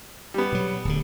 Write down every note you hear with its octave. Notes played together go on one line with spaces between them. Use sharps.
G3 B3
B2 F#3
D1 D3